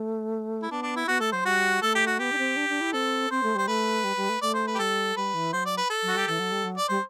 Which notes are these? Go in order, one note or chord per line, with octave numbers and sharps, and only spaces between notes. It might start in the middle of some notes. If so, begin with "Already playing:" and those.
Already playing: A3
E4
B3 D4
D4
E4
B3 F#4
A3 A4
F#3 C5
G3 F#4
A3 A4
G4
F#4
B3 G4
D4
C4
D4
D4
E4
C4 A4
C4 C5
A3
G3 C5
A3 B4
G3
G3
A3
A3 D5
C5
B4
G4
G3 A4
G3 B4
E3
F#3 C5
D5
B4
A4
F#3
F#4
G3 G4
E3 A4
F#3
G3
F#3
D5
G3 C5